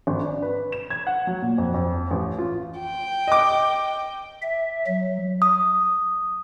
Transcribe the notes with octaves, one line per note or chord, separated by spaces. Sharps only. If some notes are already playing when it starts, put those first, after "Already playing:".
G#1
D4
B4
E7
G#6
F#5
F#3
A#2
F2
F2
A1
F4
G5
D#5 D6
E5
F#3
D#6